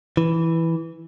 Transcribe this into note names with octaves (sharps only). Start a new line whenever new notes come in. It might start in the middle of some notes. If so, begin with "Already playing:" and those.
E3